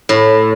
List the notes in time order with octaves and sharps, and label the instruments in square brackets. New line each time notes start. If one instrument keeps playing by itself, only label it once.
[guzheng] A2